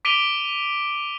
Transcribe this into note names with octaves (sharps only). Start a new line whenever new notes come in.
D6 B6 D7 D#7 F7 G7